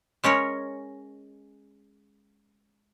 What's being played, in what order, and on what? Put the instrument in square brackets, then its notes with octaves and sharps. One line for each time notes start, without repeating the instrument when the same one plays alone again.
[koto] G#3 C#4 A#4 C#5